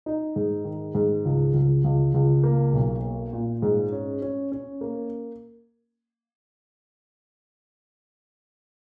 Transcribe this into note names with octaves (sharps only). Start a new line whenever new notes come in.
D#4
G#2
D#3
G#2
C#2
C#2
C#2
C#2
A#3
B1
A#3
A#2
G#2
C#4
C#4
C#4
A#3